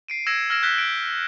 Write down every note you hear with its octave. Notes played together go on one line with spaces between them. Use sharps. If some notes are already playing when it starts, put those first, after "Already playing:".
C7 D7 D#7
E6 G#6 A#6 C#7 D7 E7
E6 F6 G#6 A#6 D7 E7
F#6 G6 A#6 B6 G7
D7